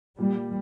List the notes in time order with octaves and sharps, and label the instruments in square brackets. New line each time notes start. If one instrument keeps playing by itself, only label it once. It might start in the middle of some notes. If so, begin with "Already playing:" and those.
[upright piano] A#2 [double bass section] G3